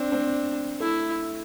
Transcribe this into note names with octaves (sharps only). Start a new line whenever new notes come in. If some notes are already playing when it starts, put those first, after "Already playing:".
Already playing: C4 D4
C4
A3 E4